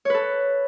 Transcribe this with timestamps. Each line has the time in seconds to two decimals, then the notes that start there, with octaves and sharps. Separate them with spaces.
0.05 C#5
0.10 B4
0.14 A4